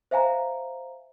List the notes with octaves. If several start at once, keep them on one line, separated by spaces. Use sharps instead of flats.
C5 E5 F5 G#5 A#5